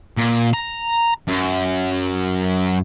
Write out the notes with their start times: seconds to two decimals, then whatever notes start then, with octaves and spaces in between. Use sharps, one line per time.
0.17 A#2
0.53 A#5
1.28 F#2